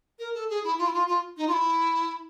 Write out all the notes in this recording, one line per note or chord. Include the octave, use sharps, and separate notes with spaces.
A#4
A4
G#4
E4
F4
E4
F4
F4
D#4
F4
E4